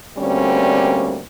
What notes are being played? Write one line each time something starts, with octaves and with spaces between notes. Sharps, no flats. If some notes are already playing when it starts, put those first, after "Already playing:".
D2 G3 A#3 C4 C#4